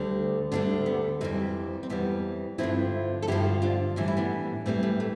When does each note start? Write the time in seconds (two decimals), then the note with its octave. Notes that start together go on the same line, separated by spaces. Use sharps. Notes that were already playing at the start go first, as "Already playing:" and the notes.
Already playing: D2 D3 G3
0.52 D2 D3 G3 B3 D4
0.86 B3
1.21 F2 E3 G3 A3 C4
1.83 C4
1.90 F2 E3 G3 B3
2.58 G2 D3 F3 C4 E4
3.22 A4
3.27 G2 D3 F3 E4 G4
3.62 D4 F4
3.96 A2 E3 G3 D4
4.08 E4
4.17 B3 D4
4.66 A2 E3 G3 A3 C4
4.83 A3
5.00 A3